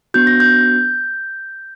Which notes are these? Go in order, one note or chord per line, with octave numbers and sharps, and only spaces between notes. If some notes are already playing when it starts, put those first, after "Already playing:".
B3 D4 F#4 G6
A#6
G6